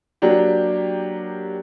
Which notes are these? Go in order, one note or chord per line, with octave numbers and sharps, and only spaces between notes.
F#3 A#3 D4 G4